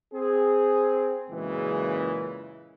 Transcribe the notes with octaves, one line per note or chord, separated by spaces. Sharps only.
C4 G#4
F#2 A#2 C#3 E3 G#3